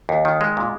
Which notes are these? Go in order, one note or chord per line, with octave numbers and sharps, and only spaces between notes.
D#2
D#3
G#3
A#2